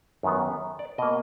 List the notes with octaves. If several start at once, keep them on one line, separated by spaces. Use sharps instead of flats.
F#2 D#3 F#3 B3
D5
B2 A#3 D#5